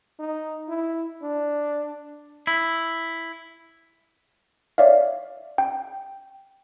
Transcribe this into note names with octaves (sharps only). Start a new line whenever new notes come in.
D#4
E4
D4
E4
C#5 D5 E5 F5
G5